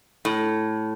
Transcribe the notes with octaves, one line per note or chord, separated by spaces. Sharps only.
A2